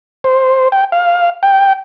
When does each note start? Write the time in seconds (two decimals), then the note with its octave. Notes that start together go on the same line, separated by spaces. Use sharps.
0.24 C5
0.72 G5
0.92 F5
1.43 G5